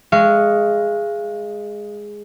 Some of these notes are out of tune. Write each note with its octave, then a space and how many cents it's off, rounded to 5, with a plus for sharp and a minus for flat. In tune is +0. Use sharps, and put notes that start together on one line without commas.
G#3 +0 F5 -30 C#6 +0